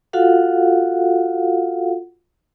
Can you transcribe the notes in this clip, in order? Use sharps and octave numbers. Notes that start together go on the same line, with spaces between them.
F4 F#4 A4 F5 F#5